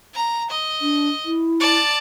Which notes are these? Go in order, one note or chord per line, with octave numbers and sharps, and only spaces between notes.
A#5
D#5
D4
E4
D5 A5